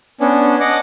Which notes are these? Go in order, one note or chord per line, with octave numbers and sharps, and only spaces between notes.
B3 C#4 D4
D#5 F#5 D6